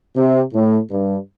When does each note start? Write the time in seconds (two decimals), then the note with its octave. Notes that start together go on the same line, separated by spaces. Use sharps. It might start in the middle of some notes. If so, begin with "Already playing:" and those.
0.16 C3
0.53 A2
0.91 G2